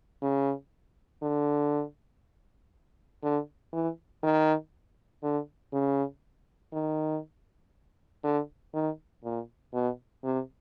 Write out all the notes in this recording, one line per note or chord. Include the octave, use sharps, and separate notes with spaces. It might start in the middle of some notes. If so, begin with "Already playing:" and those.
C#3
D3
D3
E3
D#3
D3
C#3
D#3
D3
D#3
A#2
B2
C3